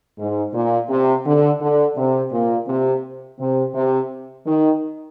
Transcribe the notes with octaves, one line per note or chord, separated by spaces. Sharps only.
G#2
A#2
C3
D3
D3
C3
A#2
C3
C3
C3
D#3